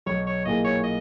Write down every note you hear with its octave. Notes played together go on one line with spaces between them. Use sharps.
B1 C#5
C#5
A#2 A#3 E4 G#4 D#5
C#5
D#5